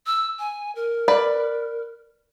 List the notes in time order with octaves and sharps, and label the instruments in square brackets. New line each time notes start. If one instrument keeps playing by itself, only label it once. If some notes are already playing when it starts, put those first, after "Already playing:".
[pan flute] E6
G#5
A#4
[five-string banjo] B4 D5